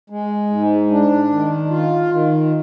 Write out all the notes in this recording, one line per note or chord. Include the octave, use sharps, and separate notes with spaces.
G#3
G#2
D4
D#3
F4
D#3